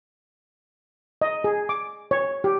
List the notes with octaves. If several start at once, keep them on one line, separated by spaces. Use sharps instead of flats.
D#5
G#4
D6
C#5
G4